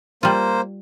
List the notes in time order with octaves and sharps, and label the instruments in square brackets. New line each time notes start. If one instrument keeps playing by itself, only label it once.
[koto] G3 F4 [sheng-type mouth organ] A#3 C5